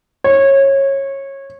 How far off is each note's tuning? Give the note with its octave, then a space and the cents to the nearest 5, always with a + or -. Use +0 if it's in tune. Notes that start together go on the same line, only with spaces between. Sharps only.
C#5 -20